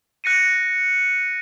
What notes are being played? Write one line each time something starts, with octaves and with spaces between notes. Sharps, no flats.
F#6 A#6 C#7 D#7